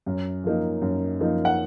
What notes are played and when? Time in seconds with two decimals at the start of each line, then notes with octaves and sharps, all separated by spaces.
0.06 F#2
0.44 F3 A#3 D#4
0.82 F#2
1.20 F3 A#3 D#4
1.45 F#5